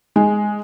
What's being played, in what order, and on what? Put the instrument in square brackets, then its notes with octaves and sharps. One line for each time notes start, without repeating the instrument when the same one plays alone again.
[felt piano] G#3